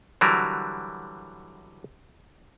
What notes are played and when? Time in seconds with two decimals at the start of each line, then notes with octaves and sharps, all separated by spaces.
0.21 D3 E3 F#3 G3 A#4